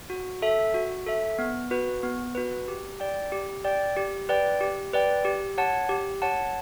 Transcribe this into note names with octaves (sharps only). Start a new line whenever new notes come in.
F#4
A4 E5
F#4
A4 E5
B3
F#4 B4
B3
F#4 B4
G4
D5 G5
G4
D5 G5
G4
B4 D5 G5
G4
B4 D5 G5
G4
C#5 F#5 A5
G4
C#5 F#5 A5